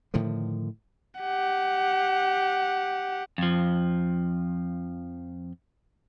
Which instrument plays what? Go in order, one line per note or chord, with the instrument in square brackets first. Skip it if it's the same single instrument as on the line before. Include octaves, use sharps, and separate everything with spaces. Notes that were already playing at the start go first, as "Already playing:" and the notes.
[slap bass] A2 D3 D#3 F3
[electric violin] G4 F#5
[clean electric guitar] F2 F3